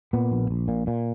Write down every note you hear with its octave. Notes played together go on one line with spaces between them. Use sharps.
A#2 B3
A#1
A#1
A#2
A#2